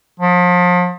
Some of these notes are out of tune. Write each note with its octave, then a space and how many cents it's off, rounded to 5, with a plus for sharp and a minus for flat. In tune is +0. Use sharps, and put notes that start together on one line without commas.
F3 +35